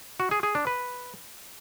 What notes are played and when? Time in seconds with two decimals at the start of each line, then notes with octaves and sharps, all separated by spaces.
0.20 F#4
0.31 G#4
0.43 G#4
0.55 D4
0.67 B4